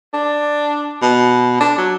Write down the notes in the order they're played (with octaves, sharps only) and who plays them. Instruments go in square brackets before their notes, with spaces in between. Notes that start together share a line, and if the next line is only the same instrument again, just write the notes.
[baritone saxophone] D4
B2
D4
F#3